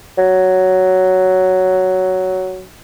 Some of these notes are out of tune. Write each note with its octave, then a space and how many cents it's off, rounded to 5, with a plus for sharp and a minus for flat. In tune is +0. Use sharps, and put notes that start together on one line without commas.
F#3 +5